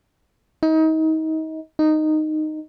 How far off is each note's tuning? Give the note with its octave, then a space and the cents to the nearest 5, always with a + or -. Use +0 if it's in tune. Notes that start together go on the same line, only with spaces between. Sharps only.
D#4 +30
D#4 -10